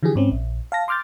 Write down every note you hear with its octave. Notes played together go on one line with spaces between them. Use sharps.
D3 E3 F3 G4 G#4
G#2 C4 C#4
A#1
F5 A5 A#6
C6 D6 F6 G6 A6